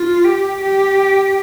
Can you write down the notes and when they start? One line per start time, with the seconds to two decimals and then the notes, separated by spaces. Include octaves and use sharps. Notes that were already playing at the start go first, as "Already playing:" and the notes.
Already playing: F4
0.25 G4
0.61 G4